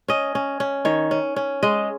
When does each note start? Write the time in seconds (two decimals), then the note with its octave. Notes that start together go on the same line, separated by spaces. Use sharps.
0.08 C#4 D#5
0.35 C#4
0.60 C#4
0.85 D#3 C#5
1.11 C#4
1.36 C#4
1.63 G#3 D#5